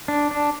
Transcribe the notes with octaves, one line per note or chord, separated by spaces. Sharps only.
D4
D4